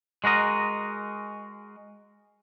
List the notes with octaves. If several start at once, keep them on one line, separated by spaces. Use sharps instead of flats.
G#3 F#4 A#4 D#5